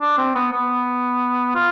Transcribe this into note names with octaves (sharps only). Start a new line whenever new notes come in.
D4
C4
B3
B3
F4